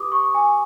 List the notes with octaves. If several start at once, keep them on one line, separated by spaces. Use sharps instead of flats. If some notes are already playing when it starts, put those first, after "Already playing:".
Already playing: G4 B4 D6 D#6
C#6
G#5